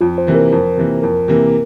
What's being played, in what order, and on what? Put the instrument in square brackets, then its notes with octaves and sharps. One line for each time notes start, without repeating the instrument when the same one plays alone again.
[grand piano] F2 [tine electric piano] F4
[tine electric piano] C5
[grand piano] C3 E3 A#3
[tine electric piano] A#4
[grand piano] F2
C3 E3 A#3
[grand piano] F2 [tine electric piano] A#4
[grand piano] C3 E3 A#3